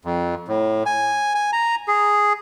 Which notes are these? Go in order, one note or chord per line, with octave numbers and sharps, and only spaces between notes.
F2
A2
G#5
G#5
A#5
G#4